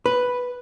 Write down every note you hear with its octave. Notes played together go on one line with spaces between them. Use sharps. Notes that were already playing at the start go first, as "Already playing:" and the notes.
B4